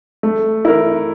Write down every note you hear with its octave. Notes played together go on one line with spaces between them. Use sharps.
A3
E4 A#4